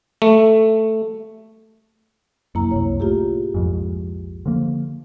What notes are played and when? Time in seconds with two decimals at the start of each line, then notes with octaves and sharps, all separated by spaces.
0.22 A3
2.55 C2 F#2 A#3 E4 A#5
2.71 C2 F#2 C3 C#5
3.00 A2 F4 G4 G#4
3.54 B1 F2 G#2
4.46 D3 F3 A#3